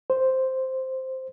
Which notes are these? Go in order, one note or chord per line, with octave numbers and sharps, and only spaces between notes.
C5